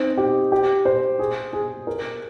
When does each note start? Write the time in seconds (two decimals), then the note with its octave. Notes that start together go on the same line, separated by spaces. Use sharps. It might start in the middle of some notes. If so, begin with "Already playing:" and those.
Already playing: C4 D#4
0.17 G4
0.52 G4
0.85 C5
1.19 G#4
1.53 G#4
1.87 A#4